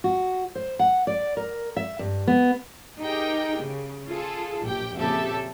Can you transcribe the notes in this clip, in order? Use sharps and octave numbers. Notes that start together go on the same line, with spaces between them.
F#4
C5
F#5
D5
A#4
E5
G2
B3
D#4 G4 G#4 A#4 G5
C#3
F4 G#4 A4
A#1 F#2 G4 G5
F2 A#2 C#3 G4 A4 E5